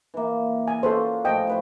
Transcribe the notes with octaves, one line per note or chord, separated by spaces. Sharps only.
E3 A#3
G#5
C#4 F4 F#4 A4 B4 C5
A2 F3 D#5 G5
F#4 B4 C5